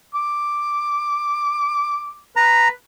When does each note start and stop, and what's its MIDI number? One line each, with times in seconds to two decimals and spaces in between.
0.14 2.20 86
2.36 2.70 71
2.36 2.68 82